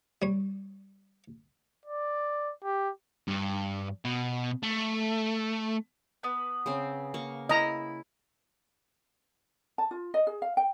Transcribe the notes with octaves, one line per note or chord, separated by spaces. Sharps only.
G3 C#5
D5
G4
G2
B2
A3
B3 B4
C#3 C4
A#3 C#6
E4 D#5 A#5
A5
F4
D#5
G#4
F5
G5